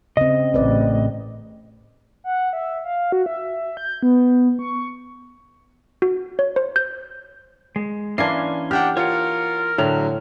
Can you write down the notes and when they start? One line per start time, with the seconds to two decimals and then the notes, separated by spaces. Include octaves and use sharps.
0.17 C#3 C4 D#5
0.54 A1 C4 B4 D5
2.24 F#5
2.53 E5
2.84 F5
3.12 F#4
3.26 E5
3.77 G6
4.03 B3
4.59 C#6
6.02 F#4
6.39 C#5
6.56 C5
6.76 G6
7.76 G#3
8.18 E3 A#3 C#4 D4 G#5 C6 C7
8.71 D4 G4 F#5 G5 F6
8.97 F4 A#4 C#5 F#5
9.78 A2 D3 F#3 A#5